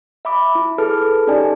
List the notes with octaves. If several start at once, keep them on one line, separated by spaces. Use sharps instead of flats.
E5 B5 D6
E4
G#4 A4 B4 A5 F6
C#4 D#4 G4 D5 G#5 A5